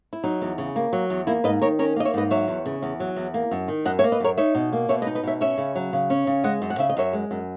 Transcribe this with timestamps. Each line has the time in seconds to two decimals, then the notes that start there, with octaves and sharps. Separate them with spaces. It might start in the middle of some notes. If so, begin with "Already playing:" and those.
0.13 E4
0.24 F#3 D#4
0.42 E2
0.58 C#3
0.76 A#3
0.93 F#3
1.10 E2
1.27 A#3 E4
1.44 G#2 B4 D#5
1.62 D#3 A#4 C#5
1.79 C#4 A#4 C#5
1.96 A#3 D#5
2.05 C#5 E5
2.14 G#2 B4 D#5
2.31 F#3 C#5 E5
2.48 E2
2.66 C#3
2.82 E2
3.00 F#3
3.16 E2
3.34 A#3
3.51 F#2
3.68 D#3
3.85 F#2 D#5 F#5
3.99 C#5 E5
4.04 A#3
4.12 B4 D#5
4.20 F#2 A#4 C#5
4.37 D#4 C#5 E5
4.55 B2
4.73 A#3
4.89 B2 C#5 E5
5.02 B4 D#5
5.07 D#4
5.15 B4 D#5
5.23 B2 C#5 E5
5.41 C#4 C#5 E5
5.58 C#3
5.75 F#3
5.93 C#3
6.10 C#4
6.27 C#3
6.44 G#3 D#5 F#5
6.62 F#2
6.70 F#5
6.78 C#3 E5
6.90 D#5
6.97 F#2 C#5 E5
7.13 G#3
7.31 F#2